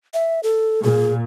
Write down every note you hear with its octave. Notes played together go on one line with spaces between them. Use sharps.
E5
A4
A#2 G#4